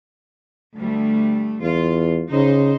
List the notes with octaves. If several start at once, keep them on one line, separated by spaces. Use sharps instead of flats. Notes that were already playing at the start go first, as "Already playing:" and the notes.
D2 G3 A3
E2 F4
C#3 D#4 C5